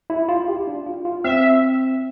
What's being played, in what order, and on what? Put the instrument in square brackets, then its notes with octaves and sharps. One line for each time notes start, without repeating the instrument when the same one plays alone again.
[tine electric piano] E4
F4
G4
D4
F4
F4
[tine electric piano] C4 [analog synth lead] E5